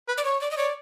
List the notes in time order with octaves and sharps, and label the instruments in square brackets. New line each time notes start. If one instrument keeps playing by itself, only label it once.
[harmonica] B4
[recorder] D5
C#5
D5
D#5
[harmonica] C#5 [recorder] D5